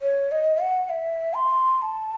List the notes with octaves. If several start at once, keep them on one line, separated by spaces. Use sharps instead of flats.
C#5
D#5
F#5
E5
C6
C6
A5